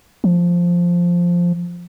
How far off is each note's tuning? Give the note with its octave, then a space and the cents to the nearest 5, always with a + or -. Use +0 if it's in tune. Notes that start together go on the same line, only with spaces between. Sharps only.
F3 +0